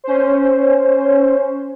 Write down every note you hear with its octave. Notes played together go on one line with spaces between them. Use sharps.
C#4 C5